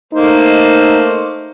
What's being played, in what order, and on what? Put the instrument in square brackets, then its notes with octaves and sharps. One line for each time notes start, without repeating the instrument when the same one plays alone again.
[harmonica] A3 A#3 C5 [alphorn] D#4